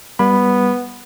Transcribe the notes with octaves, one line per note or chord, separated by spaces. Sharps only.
G3 B3 B5